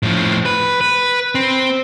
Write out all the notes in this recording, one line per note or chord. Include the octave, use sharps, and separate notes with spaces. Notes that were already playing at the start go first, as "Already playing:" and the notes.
A2 F3
B4
B4
C4